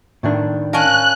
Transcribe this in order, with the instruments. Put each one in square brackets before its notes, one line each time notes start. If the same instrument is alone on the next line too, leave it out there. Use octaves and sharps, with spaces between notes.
[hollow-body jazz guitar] A2 D#3 D4
[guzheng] C#4 A#4 [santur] F5 A5 [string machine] F#6